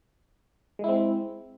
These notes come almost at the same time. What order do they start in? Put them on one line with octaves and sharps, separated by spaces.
G#3 E4 C4